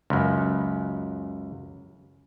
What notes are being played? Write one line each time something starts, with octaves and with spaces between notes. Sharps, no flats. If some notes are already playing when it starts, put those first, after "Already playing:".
C#2 F#2